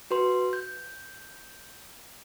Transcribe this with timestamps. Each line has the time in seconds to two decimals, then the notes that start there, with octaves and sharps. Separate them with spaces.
0.11 F#4 B4 C6
0.53 G6